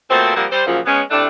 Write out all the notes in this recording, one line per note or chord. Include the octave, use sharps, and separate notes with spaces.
B2 A3 A#3 C4 F4 C5
F3 G3 A#3 C4 G4 F#5
G3 C5
F#2 A#2 C#3 F3
G#3 B3 C#4
A2 C3 A3 D4